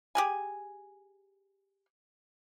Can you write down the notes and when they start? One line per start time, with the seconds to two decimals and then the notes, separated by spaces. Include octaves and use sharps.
0.15 G4 G#4 G#5